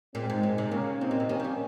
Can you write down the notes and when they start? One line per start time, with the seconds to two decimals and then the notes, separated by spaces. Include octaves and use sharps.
0.14 A#2 G#3 C4
0.30 G#2
0.43 A#2
0.58 C3
0.72 C#3 A#3 C#4
1.01 C3 C4 D#4
1.11 A#2
1.20 C3
1.29 D#3 A#3 C#4
1.40 F3
1.44 G3